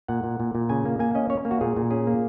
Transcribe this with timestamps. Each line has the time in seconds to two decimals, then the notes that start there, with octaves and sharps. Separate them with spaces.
0.08 A#2 F#5
0.24 A#2
0.40 A#2
0.55 A#2
0.70 C#3 G#5
0.85 A#3
0.99 A#3 G#5
1.15 C#4 D#5
1.30 C#4 C#5
1.45 A#3
1.51 F#4
1.61 A#2 G#4
1.77 A#2
1.91 C#4 G#4
2.07 A#3